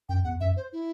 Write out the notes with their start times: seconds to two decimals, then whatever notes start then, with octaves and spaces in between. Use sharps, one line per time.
0.09 F#2 G5
0.24 E2 F#5
0.40 F#2 E5
0.56 C5
0.73 E4